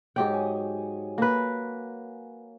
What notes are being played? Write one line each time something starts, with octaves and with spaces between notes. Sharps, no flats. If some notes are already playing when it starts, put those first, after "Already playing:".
G#2 F#3 G4 C#5 G5
G#5 D#6
A#3 B4